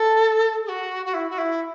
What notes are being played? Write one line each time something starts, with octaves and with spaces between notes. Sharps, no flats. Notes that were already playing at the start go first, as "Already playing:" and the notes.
Already playing: A4
G#4
F#4
F#4
E4
F#4
E4